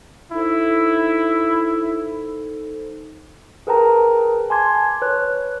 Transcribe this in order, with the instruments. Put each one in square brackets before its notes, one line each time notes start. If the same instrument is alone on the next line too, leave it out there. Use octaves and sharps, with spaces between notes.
[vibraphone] D#4 A4 C5 [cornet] E4
[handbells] G#4 A#4 B4 G5 A5 A#5
G#5 A5 C6 D6 G#6
B4 C#5 F#6